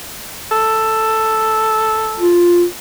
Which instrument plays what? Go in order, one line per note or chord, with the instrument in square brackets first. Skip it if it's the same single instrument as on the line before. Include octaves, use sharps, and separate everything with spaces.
[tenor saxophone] A4
[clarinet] F4